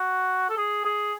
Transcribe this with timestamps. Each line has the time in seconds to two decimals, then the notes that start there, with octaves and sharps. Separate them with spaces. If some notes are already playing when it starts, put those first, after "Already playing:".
Already playing: F#4
0.50 A4
0.57 G#4
0.85 G#4